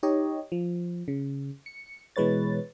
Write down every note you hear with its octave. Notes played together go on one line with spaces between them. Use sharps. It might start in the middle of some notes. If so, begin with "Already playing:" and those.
D#4 G4 C#5 D#5
F3
C#3
C#7
B2 E3 G#3 B4 C#5 A6